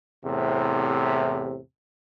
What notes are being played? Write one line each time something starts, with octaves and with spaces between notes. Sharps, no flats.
E2 A2 C3